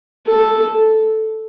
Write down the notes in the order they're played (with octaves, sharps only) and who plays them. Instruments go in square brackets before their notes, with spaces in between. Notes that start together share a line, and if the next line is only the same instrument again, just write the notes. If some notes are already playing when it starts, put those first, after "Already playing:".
[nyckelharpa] A4